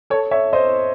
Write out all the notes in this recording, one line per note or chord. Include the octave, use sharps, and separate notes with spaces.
A4 C#5
C#5 E5
C5 D#5